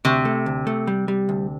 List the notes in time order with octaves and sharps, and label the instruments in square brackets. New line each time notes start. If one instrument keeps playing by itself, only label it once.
[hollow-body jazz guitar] D2 [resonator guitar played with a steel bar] C3
[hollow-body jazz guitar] A3
D2
A3
G3
G3
D2